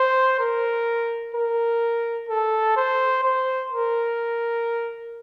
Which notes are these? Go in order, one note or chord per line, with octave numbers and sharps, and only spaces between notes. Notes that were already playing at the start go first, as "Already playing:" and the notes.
Already playing: C5
A#4
A#4
A4
C5
C5
A#4